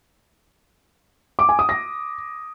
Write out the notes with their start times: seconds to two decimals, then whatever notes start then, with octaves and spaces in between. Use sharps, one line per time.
1.39 D6
1.49 G#5
1.59 D#6
1.69 A#6